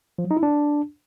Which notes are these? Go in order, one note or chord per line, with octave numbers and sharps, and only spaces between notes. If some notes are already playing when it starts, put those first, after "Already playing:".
F3
F#3
D#4
E4
D4